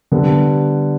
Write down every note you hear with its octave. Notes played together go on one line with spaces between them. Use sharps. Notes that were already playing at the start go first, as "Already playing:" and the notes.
D3 G3 B3